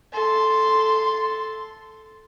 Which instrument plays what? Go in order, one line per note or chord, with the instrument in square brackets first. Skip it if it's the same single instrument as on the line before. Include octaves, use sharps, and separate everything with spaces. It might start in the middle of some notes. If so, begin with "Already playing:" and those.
[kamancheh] A4 C6